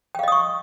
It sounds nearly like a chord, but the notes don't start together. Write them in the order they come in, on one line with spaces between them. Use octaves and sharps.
G5 F5 D#5 D#6 C#6